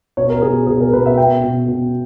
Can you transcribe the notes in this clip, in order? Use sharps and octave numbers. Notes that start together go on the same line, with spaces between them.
B2 C#5
A#4
B2 G#4
B2 G#4
A#4
B2 B4
E5
B2 G5
B2
B2